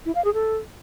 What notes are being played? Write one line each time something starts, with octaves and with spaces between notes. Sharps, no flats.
E4
F5
G#4
A4